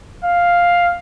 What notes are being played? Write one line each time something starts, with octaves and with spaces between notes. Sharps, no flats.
F5